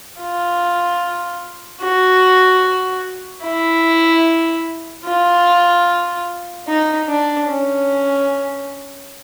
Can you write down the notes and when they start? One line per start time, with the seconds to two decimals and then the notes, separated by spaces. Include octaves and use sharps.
0.21 F4
1.82 F#4
3.44 E4
5.06 F4
6.67 D#4
7.08 D4
7.48 C#4